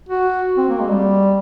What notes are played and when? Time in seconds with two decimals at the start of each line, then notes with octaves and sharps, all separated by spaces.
0.09 F#4
0.57 C4
0.69 A#3
0.80 G#3
0.91 G3